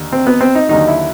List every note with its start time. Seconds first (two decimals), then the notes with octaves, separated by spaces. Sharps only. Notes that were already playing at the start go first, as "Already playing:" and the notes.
Already playing: D#2 D3
0.12 C4
0.27 B3
0.41 C4
0.55 D#4
0.69 D#2 D3 F#3 D#4
0.88 E4